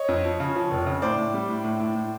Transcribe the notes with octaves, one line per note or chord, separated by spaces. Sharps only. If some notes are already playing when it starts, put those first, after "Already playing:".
Already playing: C#5 D#5
F2
F3
C#3
F3
F1
C#3
A2 C5 D5
A2
G3
A2
A2
A2
A2